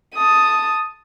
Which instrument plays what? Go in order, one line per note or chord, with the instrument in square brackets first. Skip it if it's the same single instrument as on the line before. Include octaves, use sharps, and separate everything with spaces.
[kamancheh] A5 D#6